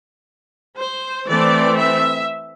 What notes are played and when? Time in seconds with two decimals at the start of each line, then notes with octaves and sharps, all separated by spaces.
0.78 C5
1.27 E3 A3 C4 D5
1.77 E5